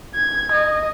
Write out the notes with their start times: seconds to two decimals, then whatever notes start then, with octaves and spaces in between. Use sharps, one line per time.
0.14 G#6
0.52 D#5